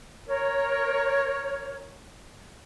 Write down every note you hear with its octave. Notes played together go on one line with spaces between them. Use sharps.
A#4 C#5